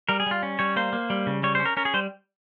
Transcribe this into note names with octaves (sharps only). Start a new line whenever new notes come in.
G3 A#4
G#4
G3 F4
C#4
G3 C#5
A#3 C5
A#3
G3
C#3
G3 C#5
C#4 C5
A#4
C#4 A#4
G#4
G3 C5